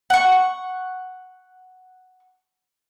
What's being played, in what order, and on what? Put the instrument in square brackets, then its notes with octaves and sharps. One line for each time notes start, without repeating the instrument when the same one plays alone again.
[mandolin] F#5 C#6